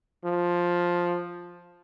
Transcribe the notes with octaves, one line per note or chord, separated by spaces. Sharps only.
F3